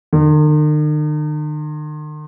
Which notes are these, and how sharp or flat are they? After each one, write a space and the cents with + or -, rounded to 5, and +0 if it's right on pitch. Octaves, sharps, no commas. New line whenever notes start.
D#3 -45